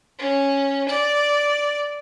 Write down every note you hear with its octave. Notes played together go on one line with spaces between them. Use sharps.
C#4
D5